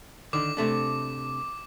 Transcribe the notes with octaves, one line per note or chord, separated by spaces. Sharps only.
D3 D#3 D6
C3 A3 D4